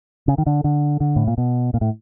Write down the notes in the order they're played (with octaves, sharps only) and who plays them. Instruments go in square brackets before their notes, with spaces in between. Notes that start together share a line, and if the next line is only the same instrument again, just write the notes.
[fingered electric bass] C#3
D#3
D3
D3
D3
A2
A#2
B2
A#2
A2